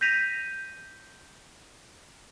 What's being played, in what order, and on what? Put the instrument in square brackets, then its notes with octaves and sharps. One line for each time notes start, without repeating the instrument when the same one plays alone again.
[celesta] G6 A#6 B6 D#7 F7